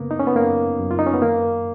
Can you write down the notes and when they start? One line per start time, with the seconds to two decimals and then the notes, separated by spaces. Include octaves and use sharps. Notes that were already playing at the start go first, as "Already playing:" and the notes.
Already playing: F#2 C#3 A#3 B3
0.11 D#4
0.19 C#4
0.27 B3
0.35 F#2 A#3
0.79 F#2
0.91 F4
0.99 D#4
1.07 C#4
1.14 B3
1.21 D#3 A#3